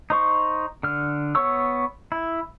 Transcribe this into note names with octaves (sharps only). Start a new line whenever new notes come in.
D#4 C5 C#6
D3 F6
B3 C#5 C#6 E6
E4